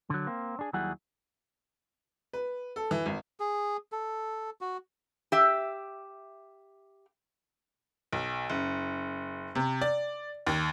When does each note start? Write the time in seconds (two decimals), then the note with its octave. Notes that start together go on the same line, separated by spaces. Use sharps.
0.10 D3 F#3
0.27 A#3 C4
0.59 D4 G#4
0.73 D#2 F#3 G3 E4 G#4 F#5
2.33 B4
2.76 A4
2.91 E3
3.06 G#1
3.40 G#4
3.92 A4
4.61 F#4
5.32 G4 E5
8.13 B1
8.50 F#1
9.55 C3
9.81 D5
10.47 D#2